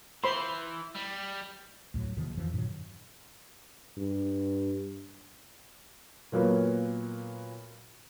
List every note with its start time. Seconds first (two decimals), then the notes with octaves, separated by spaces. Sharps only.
0.24 E3 C5 B5 C6
0.95 G3
1.94 D2 A2 F#3
2.17 D#2 C3 D#3 F3
2.37 F2 G#2 E3 F3
2.54 G2 A#2 D#3 F#3
3.97 G2
6.32 A#2 F#3 A#3 B3